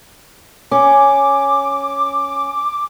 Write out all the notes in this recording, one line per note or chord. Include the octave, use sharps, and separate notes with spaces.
C#4 D6